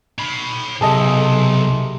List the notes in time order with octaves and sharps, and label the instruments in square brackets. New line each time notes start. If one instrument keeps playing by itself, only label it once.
[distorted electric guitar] C#5 B5
[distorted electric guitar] B1 [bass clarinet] C3 [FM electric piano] G#4 A4 D#5